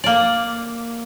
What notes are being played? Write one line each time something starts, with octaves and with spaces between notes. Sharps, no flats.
A#3 D5